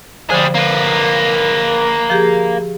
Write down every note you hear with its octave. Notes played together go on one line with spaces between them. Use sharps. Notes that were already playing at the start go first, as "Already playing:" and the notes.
D3 F3 G3 G#4 C5
A#3 B4
F3 G4 G#4